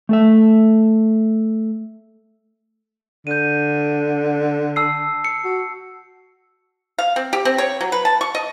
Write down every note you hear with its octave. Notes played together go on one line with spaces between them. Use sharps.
A3 A4 E5
D3 G6 D#7
A5 E6 C7
C#7
F#4
F5
C4
G4
C4
C#5
F#3
B4
A5
C#6
D#5